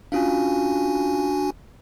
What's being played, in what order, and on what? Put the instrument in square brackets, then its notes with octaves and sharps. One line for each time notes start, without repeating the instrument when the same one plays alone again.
[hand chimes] C#4 F4 F5 [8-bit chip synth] D4 F#4 G#5